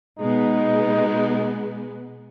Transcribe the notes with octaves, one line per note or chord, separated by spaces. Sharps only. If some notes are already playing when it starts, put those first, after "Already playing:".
B2 G#3 B3 D#4